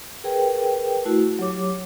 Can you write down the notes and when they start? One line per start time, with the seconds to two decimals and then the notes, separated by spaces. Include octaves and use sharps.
0.24 G#4 A#4 B4 G5
1.05 A3 E4 F#4
1.39 F#3 G4 C#5 D6